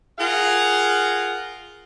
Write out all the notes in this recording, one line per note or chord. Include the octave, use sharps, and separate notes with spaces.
F4 G#4 A#4 F5 F#5